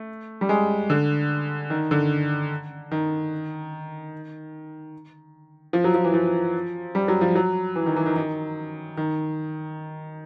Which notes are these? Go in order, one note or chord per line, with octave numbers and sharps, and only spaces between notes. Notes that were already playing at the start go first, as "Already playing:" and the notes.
Already playing: A3
G3
G#3
D3
D#3
D3
D#3
F3
F#3
F3
E3
F3
G3
F#3
F3
F#3
E3
D#3
E3
D#3
D#3
D#3